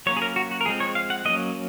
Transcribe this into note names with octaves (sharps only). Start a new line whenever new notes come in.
F#3 A#3 C#4 C#5
G#4
A#4
F#4
F#4
A#4
F3 G#3 C4 G#4
C#5
F5
F#5
F#3 A#3 C#4 D#5